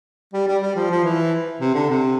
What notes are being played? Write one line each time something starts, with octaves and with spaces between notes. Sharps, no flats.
G3
G3
G3
F3
F3
E3
C3
D3
C3